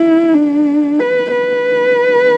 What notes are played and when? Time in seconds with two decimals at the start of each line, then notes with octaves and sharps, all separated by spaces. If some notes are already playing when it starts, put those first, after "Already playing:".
Already playing: E4
0.34 D4
0.99 B4
1.31 B4